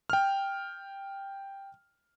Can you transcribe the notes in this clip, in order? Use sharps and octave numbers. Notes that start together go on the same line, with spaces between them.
G5 F6